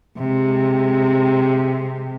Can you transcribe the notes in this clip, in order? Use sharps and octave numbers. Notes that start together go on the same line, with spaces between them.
C3 G#3